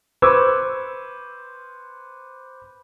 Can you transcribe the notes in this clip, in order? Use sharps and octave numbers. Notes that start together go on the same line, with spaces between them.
B4 C5 C#6 D6 E6 G#6